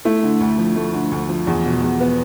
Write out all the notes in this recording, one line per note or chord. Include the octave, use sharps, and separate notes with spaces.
A3 E4
D3
D2
F3
A3
D3
D2
F3
E2
B2
E2
B3